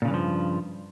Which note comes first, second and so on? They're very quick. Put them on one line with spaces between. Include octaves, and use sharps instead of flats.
A#2 C#3 E3 G2 F3